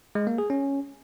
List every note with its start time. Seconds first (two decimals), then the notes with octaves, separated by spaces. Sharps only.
0.15 G#3
0.27 A#3
0.38 G#4
0.50 C#4